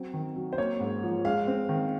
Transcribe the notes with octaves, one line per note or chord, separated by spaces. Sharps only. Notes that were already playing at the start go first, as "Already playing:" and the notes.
Already playing: F#3 C4
D#3
F#3
C5
A#3 C#5
G#2
F3
G#3 F5
C4
D#3